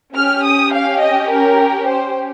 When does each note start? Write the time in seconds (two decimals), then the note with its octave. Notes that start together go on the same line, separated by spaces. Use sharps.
0.14 C#4 G4 F6
0.44 D#6
0.72 F5
1.01 D#5
1.30 A#4
1.88 C5